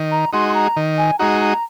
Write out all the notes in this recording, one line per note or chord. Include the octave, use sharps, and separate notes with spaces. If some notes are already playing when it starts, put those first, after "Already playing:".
Already playing: D#3
A#5
G#3 D#4 F#4 C6
C6
A#5
D#3
G#5
G#3 D#4 F#4 A#5
A#5